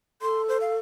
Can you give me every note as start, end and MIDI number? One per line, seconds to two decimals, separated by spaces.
0.22 0.78 69
0.22 0.42 84
0.49 0.57 72
0.61 0.74 77